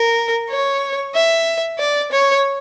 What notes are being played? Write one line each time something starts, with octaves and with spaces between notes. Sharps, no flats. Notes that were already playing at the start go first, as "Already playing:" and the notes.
Already playing: A#4
C#5
E5
D5
C#5